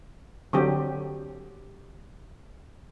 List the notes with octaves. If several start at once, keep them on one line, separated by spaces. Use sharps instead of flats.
D3 F#3 C4 G4